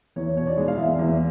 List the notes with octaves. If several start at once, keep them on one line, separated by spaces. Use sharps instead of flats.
E2 C#5
B2 C#5
D5
G#3
F5
E2 E5
E2